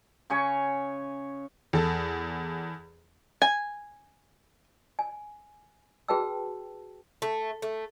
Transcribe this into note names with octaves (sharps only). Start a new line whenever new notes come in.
C#3 C#5 G#5 C#6
E2 A4
G#5
G#5
F#4 G#4 B4 G5 A5 E6
A3
A3